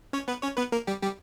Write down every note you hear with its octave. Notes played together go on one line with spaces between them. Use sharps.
C#4 C#5
B3 B4
C#4 C#5
B3 B4
A#3 A#4
G3 G4
G3 G4